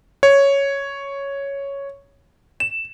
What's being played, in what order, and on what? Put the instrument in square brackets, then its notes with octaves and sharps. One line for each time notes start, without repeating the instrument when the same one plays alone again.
[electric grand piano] C#5
E7